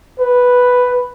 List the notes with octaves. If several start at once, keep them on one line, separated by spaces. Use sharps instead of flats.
B4